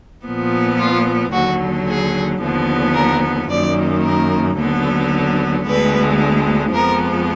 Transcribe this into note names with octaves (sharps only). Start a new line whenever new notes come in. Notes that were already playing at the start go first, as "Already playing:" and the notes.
A#2 F3 B3
F4
D#2 D3 F#3 F#4
G#4
D#2 D3 F3 B3
A#4
F#2 D#3 A#3 D5
A#4
D#2 D3 F#3 B3
D2 D3 G#3 B3 B4
F2 F3 G#3 B3 A#4